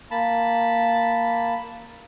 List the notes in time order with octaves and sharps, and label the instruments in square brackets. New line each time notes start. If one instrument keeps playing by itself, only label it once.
[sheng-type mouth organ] A#3 A5 B5